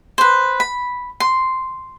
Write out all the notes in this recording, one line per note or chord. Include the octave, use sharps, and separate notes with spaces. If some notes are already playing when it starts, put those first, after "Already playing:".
B4 C5
B5
C6